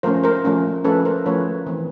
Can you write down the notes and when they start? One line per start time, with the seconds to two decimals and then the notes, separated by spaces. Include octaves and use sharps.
0.03 F3 A3 C#4 A#4 C5
0.23 A#4 C5
0.45 F3 A3 C#4
0.84 F3 A3 C#4 A4 B4
1.05 A#4 C5
1.26 F3 A3 C#4 B4 C#5
1.66 E3 A3 C4